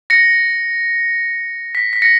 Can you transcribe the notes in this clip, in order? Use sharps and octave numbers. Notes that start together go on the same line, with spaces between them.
A#6 C#7
B6
B6
A#6 C#7